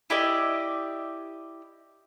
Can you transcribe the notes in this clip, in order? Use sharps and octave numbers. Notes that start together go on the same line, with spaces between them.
E4 G4 D5 D#5